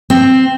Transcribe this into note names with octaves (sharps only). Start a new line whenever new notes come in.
C4